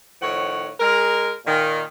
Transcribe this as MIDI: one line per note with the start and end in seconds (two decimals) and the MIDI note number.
0.22 0.70 45
0.22 0.70 51
0.22 0.70 53
0.22 0.70 73
0.22 0.70 78
0.79 1.32 56
0.79 1.32 70
1.46 1.83 46
1.46 1.83 51